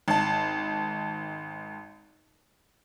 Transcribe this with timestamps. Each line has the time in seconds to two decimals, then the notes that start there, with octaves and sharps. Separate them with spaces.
0.08 G#1 A5